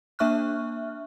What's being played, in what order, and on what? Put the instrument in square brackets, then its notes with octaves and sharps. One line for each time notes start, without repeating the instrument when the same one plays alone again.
[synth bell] A#3 D4 E5 C#6 F6 F#6